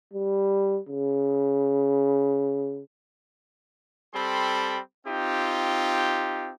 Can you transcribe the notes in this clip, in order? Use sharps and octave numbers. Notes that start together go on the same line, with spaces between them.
G3
C#3
G3 C4 A4 B5 C6
C4 D#4 F4 G4